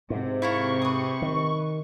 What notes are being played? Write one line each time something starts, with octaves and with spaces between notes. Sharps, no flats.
G#2 C3
E4 F4 A#4 C#6
B4 D#6
D#3